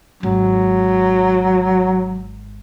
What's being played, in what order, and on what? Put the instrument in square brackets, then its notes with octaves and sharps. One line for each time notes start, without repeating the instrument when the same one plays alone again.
[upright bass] G#1 [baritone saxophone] F#3